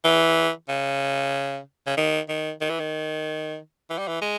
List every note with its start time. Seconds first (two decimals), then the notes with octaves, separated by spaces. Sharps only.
0.04 E3
0.69 C#3
1.87 C#3
1.97 D#3
2.29 D#3
2.61 D#3
2.70 E3
2.79 D#3
3.90 E3
3.99 G3
4.08 E3
4.21 G#3